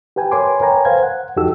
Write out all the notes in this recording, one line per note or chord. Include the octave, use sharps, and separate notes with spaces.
G4 B4 G5 G#5
A#4 B4 C#5 G#5 C6 D6
A#4 B4 C#5 G5 G#5 A#5
C5 F5 G#6
F#5
F2 D#4 F#4 G4 A4 E6